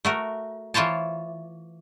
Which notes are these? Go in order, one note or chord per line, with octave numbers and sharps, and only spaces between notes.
A3 F#4 A#4
E3 F4 C5 C#5 A5